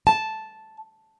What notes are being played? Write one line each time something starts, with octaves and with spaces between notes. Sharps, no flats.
A5